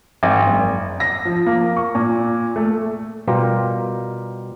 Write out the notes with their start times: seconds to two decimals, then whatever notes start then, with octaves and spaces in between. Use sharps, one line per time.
0.23 G#1
0.46 F#1
1.00 A#6
1.25 F3
1.46 A#3
1.77 C#6
1.95 A#2
2.56 A3
3.28 B2 G3 F4 G4 A#4 A#5